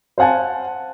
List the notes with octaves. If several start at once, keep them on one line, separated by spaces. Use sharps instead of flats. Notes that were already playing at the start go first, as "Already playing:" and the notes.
C5 F5 F#5 G#5 A5